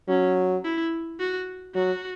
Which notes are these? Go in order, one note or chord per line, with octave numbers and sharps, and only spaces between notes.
F#3 C#4
E4
F#4
F#3 F#4